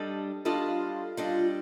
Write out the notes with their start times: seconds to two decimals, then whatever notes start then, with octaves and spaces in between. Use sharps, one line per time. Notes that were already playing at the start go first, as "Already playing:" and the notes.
Already playing: G3 D4 A4 D#5
0.45 G3 D4 F4 A4 D#5
1.17 G3 D4 A4 D#5